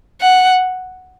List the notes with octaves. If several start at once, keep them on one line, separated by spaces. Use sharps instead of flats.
F#5